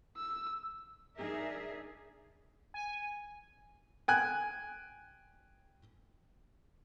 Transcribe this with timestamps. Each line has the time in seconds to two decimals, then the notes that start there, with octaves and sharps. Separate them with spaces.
0.17 E6
1.16 D4 D#4 G#4 A#4 D5 E5
2.74 G#5
4.08 G5 G#5 F#6